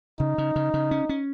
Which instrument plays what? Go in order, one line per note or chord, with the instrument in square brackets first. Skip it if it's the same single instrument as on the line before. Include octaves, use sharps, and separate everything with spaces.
[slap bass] C#3 [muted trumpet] D#4
[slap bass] C#3
C#3
C#3
C#4
C#4